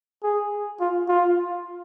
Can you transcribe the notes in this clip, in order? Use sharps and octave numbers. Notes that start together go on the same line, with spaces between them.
G#4
F4
F4